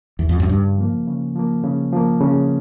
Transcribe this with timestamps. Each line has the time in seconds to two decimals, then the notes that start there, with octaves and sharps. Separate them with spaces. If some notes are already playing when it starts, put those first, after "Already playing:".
0.19 E2
0.29 F2
0.40 F#2
0.49 G2 C#3
0.78 F3 A#3
1.08 C#3
1.36 F3 A#3
1.64 C#3
1.93 F3 A#3
2.20 C#3